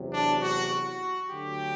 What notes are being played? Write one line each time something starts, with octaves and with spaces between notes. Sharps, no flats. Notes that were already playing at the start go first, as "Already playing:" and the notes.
Already playing: E2 C3 F#3
D4
F#4
F#4
D2 D3 F#3 G4